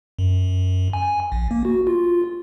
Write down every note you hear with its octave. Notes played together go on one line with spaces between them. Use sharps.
F#2
G#5
A#1
A#3
F#4
F4